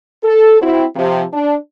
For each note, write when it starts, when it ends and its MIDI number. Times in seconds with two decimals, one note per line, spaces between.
0.24 0.59 69
0.61 0.84 60
0.61 0.84 64
0.61 0.84 66
0.96 1.23 48
0.96 1.23 53
1.33 1.56 62